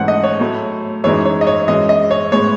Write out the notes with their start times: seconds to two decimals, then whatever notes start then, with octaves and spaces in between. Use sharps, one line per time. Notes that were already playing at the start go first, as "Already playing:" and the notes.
Already playing: G#2 E3 A3 C#4 F#5
0.08 D#5
0.23 C#5
0.40 A2 F#3 A3
1.04 F#2 E3 G#3 D#4 C#5
1.26 C#5
1.41 D#5
1.47 C#5
1.68 F#2 E3 G#3 D#5
1.89 D#5
2.11 C#5
2.32 A2 G#3 B3 C#5